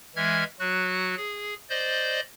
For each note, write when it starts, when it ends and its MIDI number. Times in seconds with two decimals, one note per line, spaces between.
0.16 0.44 52
0.16 0.44 56
0.16 0.44 76
0.16 0.44 89
0.16 0.44 92
0.60 1.15 54
0.60 1.15 66
0.60 1.15 90
1.17 1.54 68
1.70 2.20 72
1.70 2.20 74
1.70 2.20 75
1.70 2.20 91